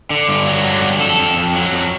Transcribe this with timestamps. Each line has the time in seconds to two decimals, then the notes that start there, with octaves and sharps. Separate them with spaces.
0.10 D3
0.29 G2
0.47 F#3
0.65 D3
0.82 G2
1.01 F2 A4
1.19 F2
1.37 F2
1.55 F#3
1.73 F2